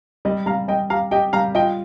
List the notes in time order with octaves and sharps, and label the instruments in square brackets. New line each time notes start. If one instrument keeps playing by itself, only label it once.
[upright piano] G3 [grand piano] D#5
[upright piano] G3 [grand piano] F5 A#5
[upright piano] G3 [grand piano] D#5 G5
[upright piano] G4 [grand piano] F5 A#5
[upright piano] G4 [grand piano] D#5 G5
[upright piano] G3 [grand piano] F5 A#5
[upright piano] F4 [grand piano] D#5 G5